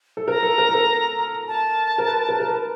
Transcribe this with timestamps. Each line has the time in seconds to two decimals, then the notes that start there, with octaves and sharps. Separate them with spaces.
0.17 A4
0.28 A#4 A#5
0.43 A4
0.58 A#4
0.69 A4
0.74 A#4
1.48 A5
1.98 A#4
2.07 B4
2.29 A#4
2.40 A#4
2.48 B4